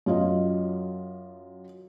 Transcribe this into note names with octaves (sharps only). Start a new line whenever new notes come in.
F#2 F4 D#5